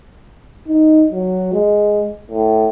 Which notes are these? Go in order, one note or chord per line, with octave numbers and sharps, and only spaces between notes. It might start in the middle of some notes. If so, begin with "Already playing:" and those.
D#4
F#3
G#3
A2